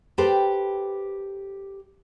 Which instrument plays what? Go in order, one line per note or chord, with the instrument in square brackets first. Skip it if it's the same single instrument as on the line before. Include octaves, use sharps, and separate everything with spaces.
[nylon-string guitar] G4 A4 B4 C5 G5